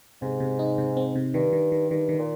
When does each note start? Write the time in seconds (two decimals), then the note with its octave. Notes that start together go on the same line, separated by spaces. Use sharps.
0.22 G#2 C3
0.40 C3
0.59 D#4
0.78 C3
0.97 C4
1.15 C3
1.34 G2 D#3
1.53 D#3
1.72 D#3
1.90 G2 D#3
2.09 D#3
2.18 A#2